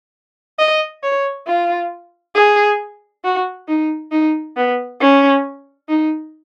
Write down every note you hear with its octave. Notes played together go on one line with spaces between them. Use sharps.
D#5
C#5
F4
G#4
F#4
D#4
D#4
B3
C#4
D#4